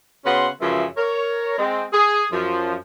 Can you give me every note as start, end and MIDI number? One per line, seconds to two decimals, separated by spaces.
0.25 0.48 49
0.25 0.48 59
0.25 0.48 61
0.25 0.48 66
0.25 0.48 84
0.60 0.85 42
0.60 0.85 49
0.60 0.85 52
0.60 0.85 53
0.60 0.85 56
0.60 0.85 76
0.97 1.55 70
0.97 1.55 73
1.57 1.83 56
1.57 1.83 60
1.93 2.26 68
2.32 2.74 42
2.32 2.74 53